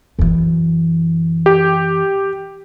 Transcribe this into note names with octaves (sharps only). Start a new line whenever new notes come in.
F#2 E3
G4